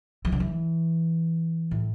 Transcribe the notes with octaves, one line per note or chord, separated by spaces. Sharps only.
E3
D3
E3
A2